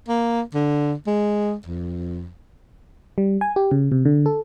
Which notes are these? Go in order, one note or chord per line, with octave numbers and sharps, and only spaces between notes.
A#3
D3
G#3
F2
G3
G#5
G4
C#3
C3
D3
A4